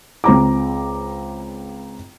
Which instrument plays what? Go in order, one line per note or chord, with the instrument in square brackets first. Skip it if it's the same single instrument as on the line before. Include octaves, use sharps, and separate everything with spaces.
[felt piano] C#2 C4 A#5 D6